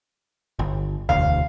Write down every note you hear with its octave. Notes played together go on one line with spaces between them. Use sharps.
G1
E1 D2 F5